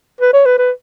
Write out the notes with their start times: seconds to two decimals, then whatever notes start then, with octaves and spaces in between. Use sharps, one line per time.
0.21 B4
0.33 C#5
0.45 B4
0.58 B4